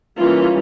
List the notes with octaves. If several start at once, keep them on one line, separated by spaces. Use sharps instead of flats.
E3 G3 A#3 C#4 F4